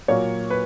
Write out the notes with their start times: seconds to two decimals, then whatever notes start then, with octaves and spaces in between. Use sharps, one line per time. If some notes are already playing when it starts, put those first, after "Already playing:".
0.08 A#2 F#3 A#3 C#5
0.50 B4